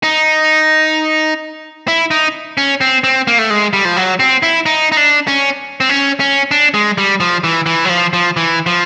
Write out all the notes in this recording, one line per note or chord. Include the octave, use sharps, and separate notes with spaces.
D#4
E4
D#4
C#4
C4
C4
A#3
A3
G#3
G3
F3
F#3
C4
E4
D#4
D#4
D4
C#4
C4
C#4
C#4
D4
G#3
G3
F3
E3
E3
F#3
F3
F3
E3
F3